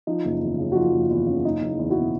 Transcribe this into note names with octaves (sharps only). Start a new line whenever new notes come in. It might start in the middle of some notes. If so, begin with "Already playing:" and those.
F3 D#4
F#1
E2
C#3
F#4
F3 D#4 F4
F#1
E2 E4
C#3
F#1 D#4
F#1
E4
E2
E4 F#4
B2